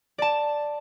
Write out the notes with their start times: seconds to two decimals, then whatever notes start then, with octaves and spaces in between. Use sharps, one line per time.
0.18 D5 A5